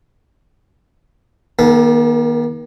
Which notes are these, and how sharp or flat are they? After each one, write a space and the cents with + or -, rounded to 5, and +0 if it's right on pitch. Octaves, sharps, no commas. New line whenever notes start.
D#3 +0 A#3 +40 A4 -25